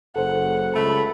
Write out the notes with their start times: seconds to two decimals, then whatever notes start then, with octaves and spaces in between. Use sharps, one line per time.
0.16 F#1 A4 C5 F#5
0.75 C#2 A3 B5